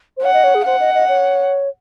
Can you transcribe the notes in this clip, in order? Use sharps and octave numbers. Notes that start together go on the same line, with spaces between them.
C5
C#5 F#5
D#5
C#5
G#4
C5 F#5
D#5
D#5
C#5